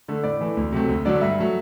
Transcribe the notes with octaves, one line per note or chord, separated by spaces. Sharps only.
D3 A3
A2 D5
E3 A3
D2
C3 F#3 A3
D2
D3 F#3 A3 D5
G2 E5
F#3 A3